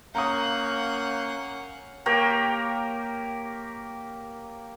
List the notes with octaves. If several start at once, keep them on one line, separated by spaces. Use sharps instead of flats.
A#3 C#4 F5 F#5 A#5 D#6 G6
A#3 G4 A#4 C#5